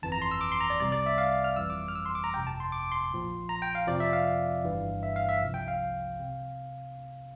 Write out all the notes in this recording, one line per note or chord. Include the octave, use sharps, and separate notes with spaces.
G1 F2 E3 A5
A#5
C6
E6
D6
C6
A#5
D5
C2 C3 G3 D5
D5
E5
F5
F6
G1 F2 E3 G3 E6
D6
F6
E6
C6
D6
A#5
G1 F2 C3 G5
A5
C6
D6
C6
A#1 A#2 F3
A#5
G5
F5
F2 C3 F3 D5
E5
F5
G1 G2 E3 G3
E5
F5
E5
C2 C3 F3
G5
F5
C3